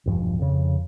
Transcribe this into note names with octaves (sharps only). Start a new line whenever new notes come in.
E1 G2 F3
F2 C#3